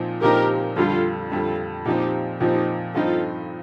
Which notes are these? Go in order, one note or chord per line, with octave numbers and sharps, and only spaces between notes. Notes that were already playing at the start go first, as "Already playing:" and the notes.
Already playing: A#2 F3 C4 D#4
A#2 F3 C4 D#4 G4 A#4
F2 D3 G3 F4 A4
F2 D3 G3 F4 A4
A#2 F3 C4 D#4 G4
A#2 F3 C4 D#4 G4
G2 F3 C4 D#4 F4 A4